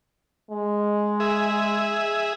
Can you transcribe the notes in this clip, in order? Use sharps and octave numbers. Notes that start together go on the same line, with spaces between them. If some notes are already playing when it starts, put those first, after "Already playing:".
G#3
G#4 E5